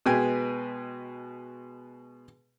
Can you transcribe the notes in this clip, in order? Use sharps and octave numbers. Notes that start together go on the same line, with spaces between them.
B2 G#3 B4 G5 G#5